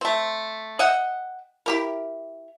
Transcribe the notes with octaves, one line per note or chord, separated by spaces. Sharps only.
A3 C4
D#5 E5 F#5 G5
E4 G4 A#4